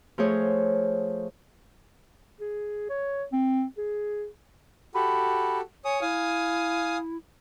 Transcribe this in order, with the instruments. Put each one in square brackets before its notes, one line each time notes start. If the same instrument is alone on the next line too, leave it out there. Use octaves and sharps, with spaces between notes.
[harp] F3 A3 F4 G#4 C5 C#5
[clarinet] G#4
C#5
C4
G#4
[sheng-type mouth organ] F#4 G4 A4 [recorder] B5
[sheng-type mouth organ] C#5 D#6 [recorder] G#5
[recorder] E4 [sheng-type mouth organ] F5 G#5 D#6